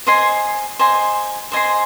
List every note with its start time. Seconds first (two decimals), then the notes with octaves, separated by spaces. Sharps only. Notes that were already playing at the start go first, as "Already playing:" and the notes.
0.07 C5 D#5 G#5 C6
0.79 C5 D#5 G#5 C6
1.52 C5 D#5 G#5 C6